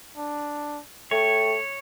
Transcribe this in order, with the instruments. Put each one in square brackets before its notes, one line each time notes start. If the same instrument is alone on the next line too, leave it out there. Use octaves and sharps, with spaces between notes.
[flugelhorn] D4
[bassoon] A3 [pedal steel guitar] C#5 [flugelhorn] G5